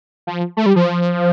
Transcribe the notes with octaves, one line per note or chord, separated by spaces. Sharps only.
F3
A3
G3
F3